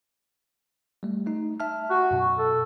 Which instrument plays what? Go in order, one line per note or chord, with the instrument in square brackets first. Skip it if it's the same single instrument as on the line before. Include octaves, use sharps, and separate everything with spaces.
[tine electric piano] G3 A3
A3 D#4
E5 A5 F6
[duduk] F#4
[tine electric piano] F#2 B2
[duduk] A4